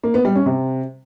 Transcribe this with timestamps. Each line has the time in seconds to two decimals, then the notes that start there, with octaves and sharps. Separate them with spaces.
0.04 A#3
0.14 B3
0.25 G3
0.35 C#4
0.46 C3